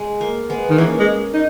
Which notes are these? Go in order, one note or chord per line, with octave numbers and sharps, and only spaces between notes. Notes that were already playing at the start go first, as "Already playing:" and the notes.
Already playing: G#3
A#3
G#3 B3
D#3
E3 A#3 C#4
G#3
D#4